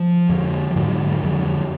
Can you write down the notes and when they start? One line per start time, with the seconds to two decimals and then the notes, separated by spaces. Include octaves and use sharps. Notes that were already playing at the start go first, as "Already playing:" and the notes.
Already playing: F3
0.29 F2 D3
0.70 F3
0.76 G#2 D3 F#3
1.23 F2 D3